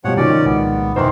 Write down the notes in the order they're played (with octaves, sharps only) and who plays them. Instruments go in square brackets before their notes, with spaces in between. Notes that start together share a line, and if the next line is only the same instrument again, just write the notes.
[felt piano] B2 G3 [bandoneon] F3 C#5 F#5
[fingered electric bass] C3 [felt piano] D#3 F3 F#4 [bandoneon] C#4 D5
[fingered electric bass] C2 A#2 G#3 [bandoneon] B3
[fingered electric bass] G1 F2 B2 [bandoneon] D#3 E3 [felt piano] C5 A#5 C6